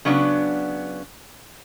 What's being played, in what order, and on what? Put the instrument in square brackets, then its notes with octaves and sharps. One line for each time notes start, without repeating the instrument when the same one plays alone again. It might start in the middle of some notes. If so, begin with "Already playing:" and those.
[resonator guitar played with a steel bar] C#3 F#3 B3 D4